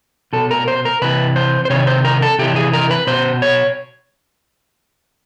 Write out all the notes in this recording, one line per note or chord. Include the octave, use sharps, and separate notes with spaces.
B2 A4
A#4
C5
A#4
C3 E3 B4
C5
C5
C3 D#3 C#5
C5
A#4
A4
C3 E3 G4
G#4
A#4
B4
B2 C5
C#5